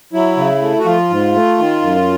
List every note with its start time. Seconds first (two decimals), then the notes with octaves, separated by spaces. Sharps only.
0.13 F#3 E4
0.37 C#3
0.62 A3
0.79 F#4
0.85 F3 F4
1.10 G#2
1.34 A3
1.58 D#3
1.82 F#2